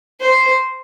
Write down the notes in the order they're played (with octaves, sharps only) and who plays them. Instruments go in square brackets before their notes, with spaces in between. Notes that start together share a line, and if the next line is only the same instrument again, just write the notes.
[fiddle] C5